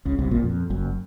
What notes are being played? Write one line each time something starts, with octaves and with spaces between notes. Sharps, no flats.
C#2 C#3
C2 C3
A#1 A#2
F2
F#1 F#2